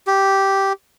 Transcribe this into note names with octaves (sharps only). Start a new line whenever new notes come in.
G4